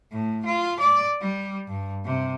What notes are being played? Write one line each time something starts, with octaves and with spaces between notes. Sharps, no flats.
A2
F4
D5
G3
G2
C3